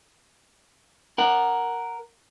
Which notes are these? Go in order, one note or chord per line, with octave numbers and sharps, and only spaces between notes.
A#4 F#5